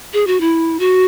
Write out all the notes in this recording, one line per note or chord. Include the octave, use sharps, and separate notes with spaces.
G#4
F#4
E4
F#4